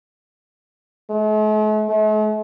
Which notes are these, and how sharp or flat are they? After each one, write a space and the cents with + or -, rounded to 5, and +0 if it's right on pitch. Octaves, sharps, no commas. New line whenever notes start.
A3 -45
A3 -45